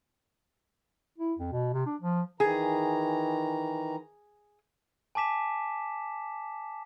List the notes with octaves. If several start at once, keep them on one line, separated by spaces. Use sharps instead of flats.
E4
F2
B2
C3
D4
F3
D#3 E3 G#4 A#5
G#5 A5 D6 B6 E7